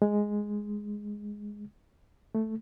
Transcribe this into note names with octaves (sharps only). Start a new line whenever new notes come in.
G#3
A3